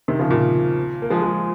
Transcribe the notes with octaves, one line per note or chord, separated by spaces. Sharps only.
C3 D#3
C#3 F3
A#2
A#3
F3 G#3
F3 G#3